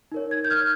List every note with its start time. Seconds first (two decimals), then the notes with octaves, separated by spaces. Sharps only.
0.12 D#4 A#4 C#5
0.31 G#6
0.45 G6
0.51 F6